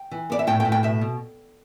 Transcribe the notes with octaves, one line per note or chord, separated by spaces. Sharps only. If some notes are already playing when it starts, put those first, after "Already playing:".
Already playing: G5
E3
B3 D5
E5
A2 G5
G5
A2
G5
B2 E5
B2